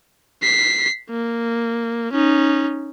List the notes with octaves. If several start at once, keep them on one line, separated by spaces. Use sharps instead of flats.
B6 C7
A#3
C#4 D#4